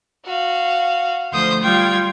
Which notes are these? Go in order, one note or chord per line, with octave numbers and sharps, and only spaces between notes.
F#4 F5
D2 F3 C5 C6 D#6 G6
G3 F4 G5 G#6